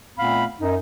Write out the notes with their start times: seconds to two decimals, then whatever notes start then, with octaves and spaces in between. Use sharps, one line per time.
0.17 A#2 A3 B3 C4 F5 B5
0.60 F#2 D#4